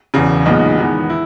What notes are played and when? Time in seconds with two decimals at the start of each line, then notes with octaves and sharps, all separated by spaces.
0.14 E1 E2 C#3
0.46 B1 A#2 G#3 B3 D#4
0.77 E2 D#3 G#3 B3
1.10 E4